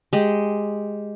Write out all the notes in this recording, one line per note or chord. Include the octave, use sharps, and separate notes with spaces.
G#3 G4